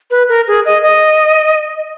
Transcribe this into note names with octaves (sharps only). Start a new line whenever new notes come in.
B4
A#4
G#4
D#5
D#5